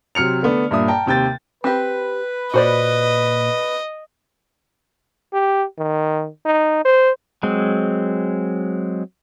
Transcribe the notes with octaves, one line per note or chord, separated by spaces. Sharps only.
C3 F#3 F6 C#7 F7
D3 A3 B3 D4
G2 A#2 E5 D#6
G5 A5 A#5
D#2 C3 G5 G6 A6
C4 G4 B4
A#2 F#4 C5 D5 D#5
G4
D#3
D#4
C5
F#3 G#3 C4